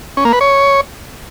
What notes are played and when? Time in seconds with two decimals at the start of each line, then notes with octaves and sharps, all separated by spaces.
0.17 C#4
0.25 A#3
0.33 B4
0.41 C#5